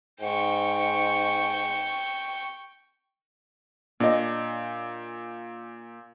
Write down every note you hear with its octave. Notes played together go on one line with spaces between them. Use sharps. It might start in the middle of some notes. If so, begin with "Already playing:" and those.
G#2 G5 C#6
A#2 D4 C#5 D#5